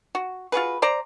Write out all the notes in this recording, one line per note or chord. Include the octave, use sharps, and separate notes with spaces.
F#4
F4 F#4 G#4 B4
C5 D5 A#5